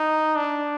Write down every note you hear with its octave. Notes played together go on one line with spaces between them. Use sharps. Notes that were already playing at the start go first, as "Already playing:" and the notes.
Already playing: D#4
D4